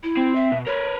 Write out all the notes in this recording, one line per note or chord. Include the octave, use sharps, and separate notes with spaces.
E4
C4
E5
B2
A#4 B4 C#5